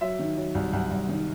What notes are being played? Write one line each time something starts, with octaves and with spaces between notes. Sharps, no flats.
F#3 E5
D#3
F#3
C2
C2 F#5
C2
D#3